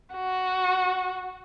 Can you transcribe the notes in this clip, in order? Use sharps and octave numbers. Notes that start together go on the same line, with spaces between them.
F#4